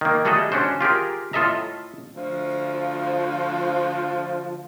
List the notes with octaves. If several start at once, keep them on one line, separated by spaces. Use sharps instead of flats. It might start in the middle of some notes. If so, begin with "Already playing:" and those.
D#3 A#3
G3 A3 F#4 G#4 A4 D#5
C#4 D4 F#4 C5
F4 G4 G#4 A#4
A2 F4 A4 D#5 E5 A#5
D2 F3